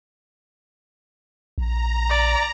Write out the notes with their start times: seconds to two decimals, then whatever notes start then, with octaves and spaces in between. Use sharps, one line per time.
1.58 A#1 A#5
2.09 D5